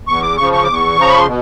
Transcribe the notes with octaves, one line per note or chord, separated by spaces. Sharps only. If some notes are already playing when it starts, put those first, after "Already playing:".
E2 C#6
D6
C#3 F3 C#6
C#6
E2 D6
C#6
C#3 F3 A#5
B5
C6
B2